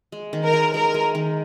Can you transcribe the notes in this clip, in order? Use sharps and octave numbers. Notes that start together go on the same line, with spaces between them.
G#3
D#3
A#4
G#3
G#3 A#4
G#3
D#3